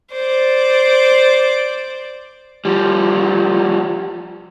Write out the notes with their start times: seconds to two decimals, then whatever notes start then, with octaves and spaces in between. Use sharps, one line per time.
0.12 C5 D5
2.65 F3 G3